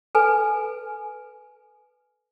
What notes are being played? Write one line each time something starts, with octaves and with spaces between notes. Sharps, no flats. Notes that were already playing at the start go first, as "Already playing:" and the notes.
A4 B4 G#5